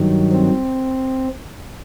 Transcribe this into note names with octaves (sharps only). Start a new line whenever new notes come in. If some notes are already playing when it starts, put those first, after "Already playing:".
Already playing: G2 D#3 F#3
C4